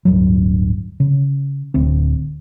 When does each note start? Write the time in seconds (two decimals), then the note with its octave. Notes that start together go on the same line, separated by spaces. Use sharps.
0.05 D1 G2 F#3
1.00 C#3
1.74 D1 D2 C4